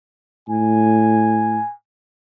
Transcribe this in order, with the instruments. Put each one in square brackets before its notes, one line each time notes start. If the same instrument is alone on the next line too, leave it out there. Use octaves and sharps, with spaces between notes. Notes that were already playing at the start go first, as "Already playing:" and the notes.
[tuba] A2 [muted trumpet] G#5